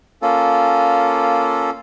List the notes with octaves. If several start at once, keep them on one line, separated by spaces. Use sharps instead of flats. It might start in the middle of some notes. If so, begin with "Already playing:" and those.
A#3 C#4 F4 A4